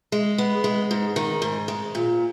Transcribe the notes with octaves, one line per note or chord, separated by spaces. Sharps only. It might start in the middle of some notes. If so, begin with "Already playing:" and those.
G#3
B3
G#3
G#2
D#3
G#2
G#3
A#2